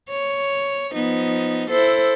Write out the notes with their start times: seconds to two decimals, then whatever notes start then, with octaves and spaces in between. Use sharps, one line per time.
0.10 C#5
0.95 F3 B3 D#4
1.70 E4 A4 C5